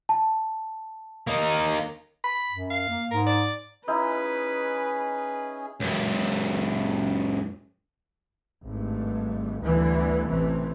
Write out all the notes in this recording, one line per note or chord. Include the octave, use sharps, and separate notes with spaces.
A5
A#3 D#4
B5
F#2
F5
A#3
G#2 A#4
D5
C#4 D#4 E4 G#4 B4 D#5
C#2 F#2
G#1 G2 A3
D2 G2 D3 E3 B3
A1 C3 E3 A3 C4